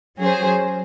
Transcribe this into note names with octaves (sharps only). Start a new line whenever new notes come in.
F#3 C#4 G#4 C5